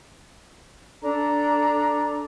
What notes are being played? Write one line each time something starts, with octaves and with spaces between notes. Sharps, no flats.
D4 A4 A#5